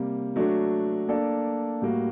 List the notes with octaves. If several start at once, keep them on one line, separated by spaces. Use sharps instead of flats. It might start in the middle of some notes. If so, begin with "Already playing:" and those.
Already playing: C3 G3 A#3
F#3 A3 D4 F#4
A#3 D4 A4 D5
A2 G3 A#3 F#4